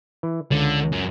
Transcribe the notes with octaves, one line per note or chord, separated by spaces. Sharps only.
E3
C#2 D3
F#2